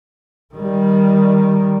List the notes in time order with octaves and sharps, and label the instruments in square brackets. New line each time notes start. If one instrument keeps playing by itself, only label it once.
[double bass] D#3 G3